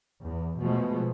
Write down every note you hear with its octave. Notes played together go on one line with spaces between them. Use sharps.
E2
B2 F3 G#3 A3